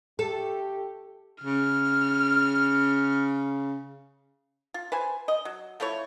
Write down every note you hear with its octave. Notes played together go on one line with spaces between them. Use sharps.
A3 G4 A4
C#3 F6
F4
B4 C5 G#5
D#5
F#3
F3 A3 E4 C#5